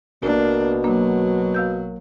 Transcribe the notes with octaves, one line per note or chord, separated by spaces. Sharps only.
A1 B2 A#3 D4 A#4
F#3 A#3 D4
F5 E6 G6